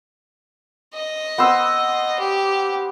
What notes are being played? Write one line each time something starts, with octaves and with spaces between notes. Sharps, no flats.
D#5
B3 C5 E6
G4